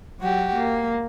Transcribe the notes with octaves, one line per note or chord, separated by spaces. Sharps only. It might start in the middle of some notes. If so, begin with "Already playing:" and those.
F#3 F#4 G4
A#3